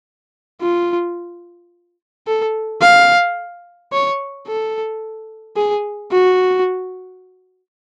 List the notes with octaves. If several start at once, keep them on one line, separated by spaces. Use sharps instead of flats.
F4
A4
F5
C#5
A4
G#4
F#4